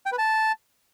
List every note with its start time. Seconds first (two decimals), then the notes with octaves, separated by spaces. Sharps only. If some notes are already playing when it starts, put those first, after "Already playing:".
0.06 G5
0.12 B4
0.18 A5